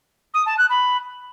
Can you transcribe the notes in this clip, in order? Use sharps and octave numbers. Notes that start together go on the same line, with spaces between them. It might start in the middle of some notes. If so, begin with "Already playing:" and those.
D#6
A5
F#6
B5